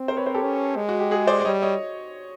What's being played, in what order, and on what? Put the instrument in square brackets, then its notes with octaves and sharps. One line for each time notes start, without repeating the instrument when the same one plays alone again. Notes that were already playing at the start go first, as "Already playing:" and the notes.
Already playing: [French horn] C4
[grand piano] A#4 C5
B4 C#5
A#4 C5
G4 A4
[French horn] C#4
G#3
[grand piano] F#4
G4
F#4 G#4
C5 D5
D5
[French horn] G3 [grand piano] C#5 D#5
[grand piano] C#5 D#5